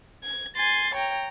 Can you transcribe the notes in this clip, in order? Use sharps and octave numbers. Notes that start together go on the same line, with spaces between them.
G#6
G#5 C6 A6
C#5 G5 A#5